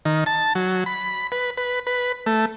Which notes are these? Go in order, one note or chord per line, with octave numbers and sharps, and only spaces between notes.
D#3
A5
F#3
B5
B4
B4
B4
A3